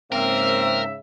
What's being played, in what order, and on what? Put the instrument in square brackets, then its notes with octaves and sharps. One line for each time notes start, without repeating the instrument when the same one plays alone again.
[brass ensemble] G#2 C#3 E5 [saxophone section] A#3 C4 [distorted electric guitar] A#4